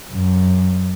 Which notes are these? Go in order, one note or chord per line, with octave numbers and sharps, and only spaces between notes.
F#2